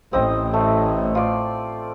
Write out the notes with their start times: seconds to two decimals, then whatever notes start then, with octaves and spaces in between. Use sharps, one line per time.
0.13 A1 A2 C4 D#5 D#6
0.54 A3
1.15 F4 D5